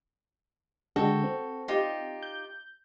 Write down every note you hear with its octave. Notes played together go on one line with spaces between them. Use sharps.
D3 G#3 F#4 A4 G5
C4
D#4 F4 G4
G6